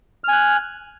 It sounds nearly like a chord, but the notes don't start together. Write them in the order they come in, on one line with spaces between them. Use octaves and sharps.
F6 G#5 F#6